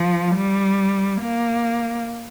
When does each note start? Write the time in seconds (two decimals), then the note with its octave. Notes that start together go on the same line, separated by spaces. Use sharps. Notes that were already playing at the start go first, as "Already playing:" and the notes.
Already playing: F3
0.36 G3
1.22 A#3